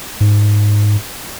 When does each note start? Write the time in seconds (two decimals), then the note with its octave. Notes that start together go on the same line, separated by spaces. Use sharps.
0.20 G#2